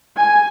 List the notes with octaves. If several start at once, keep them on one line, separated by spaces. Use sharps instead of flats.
G#5